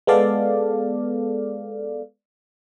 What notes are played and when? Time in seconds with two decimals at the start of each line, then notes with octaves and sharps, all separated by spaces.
0.07 G#3 B3 A4 D5 F5